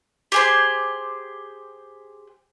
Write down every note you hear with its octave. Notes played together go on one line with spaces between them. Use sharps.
G4 G#4 C5